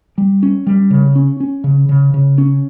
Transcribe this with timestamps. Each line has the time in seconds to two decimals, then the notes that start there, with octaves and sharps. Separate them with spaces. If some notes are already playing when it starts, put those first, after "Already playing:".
0.18 G3
0.43 C#4
0.67 G3
0.91 C#3
1.15 C#4
1.40 C#4
1.64 C#3
1.89 C#3
2.14 C#3
2.38 C#4